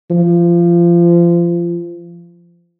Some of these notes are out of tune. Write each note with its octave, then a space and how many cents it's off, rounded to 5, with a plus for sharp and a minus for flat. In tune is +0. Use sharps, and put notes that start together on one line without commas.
F3 -25